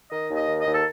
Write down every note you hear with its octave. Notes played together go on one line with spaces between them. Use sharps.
D#3 D#5
D#2
D#5
D#3
D#5
D#2
A4